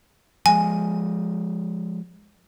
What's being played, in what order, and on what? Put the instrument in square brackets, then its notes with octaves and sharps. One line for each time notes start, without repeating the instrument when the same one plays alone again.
[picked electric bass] F3 G#3 [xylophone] G#5